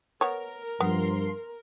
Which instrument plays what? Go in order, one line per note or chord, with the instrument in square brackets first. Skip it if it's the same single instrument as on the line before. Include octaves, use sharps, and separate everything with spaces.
[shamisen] B3 C#5 [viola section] A#4
[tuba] G2 [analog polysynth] F3 C6 [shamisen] B3